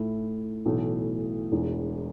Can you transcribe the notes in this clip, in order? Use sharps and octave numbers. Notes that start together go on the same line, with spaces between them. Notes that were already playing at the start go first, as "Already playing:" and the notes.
Already playing: A2 A3 E4
B1 A2 E3 A3
E1 E2 E3